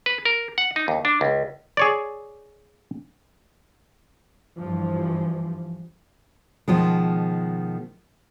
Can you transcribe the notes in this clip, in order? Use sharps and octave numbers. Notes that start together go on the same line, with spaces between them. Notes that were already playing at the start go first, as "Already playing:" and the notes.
B4
A#4
F#5
D#4
D#2
D4
C#2
G#4 C#5 D5
G2 E3 F3
B2 D#3 F3 G#3